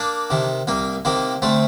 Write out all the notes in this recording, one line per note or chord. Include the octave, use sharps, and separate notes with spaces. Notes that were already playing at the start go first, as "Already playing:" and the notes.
Already playing: A#3 D4
C3 D#3
C2 A#3
C3 D#3 A#3
D2 A3 C4